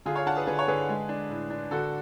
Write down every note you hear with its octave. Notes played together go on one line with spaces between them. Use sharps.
D3 F4 G#4
C#5 F5
D4 F#5 A5
G#4 B4
D3 G#4 B4
C#5
D3 G#4 B4
G#3
D4
A2
D4
D3 F#4 A4